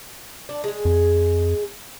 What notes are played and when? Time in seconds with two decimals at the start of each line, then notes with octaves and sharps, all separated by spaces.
0.49 D4
0.64 G#3 G#4
0.85 F2